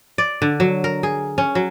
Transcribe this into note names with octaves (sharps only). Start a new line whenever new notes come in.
D5
D3
F#3
A#4
G#4
C#4
F#3